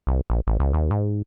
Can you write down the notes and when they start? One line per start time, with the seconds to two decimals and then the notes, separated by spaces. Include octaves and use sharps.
0.07 C2
0.30 A#1
0.47 A1
0.60 C#2
0.73 D#2
0.91 G#2